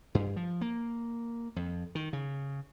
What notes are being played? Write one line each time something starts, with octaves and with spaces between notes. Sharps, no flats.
G2
F3
A#3
F2
D#3
C#3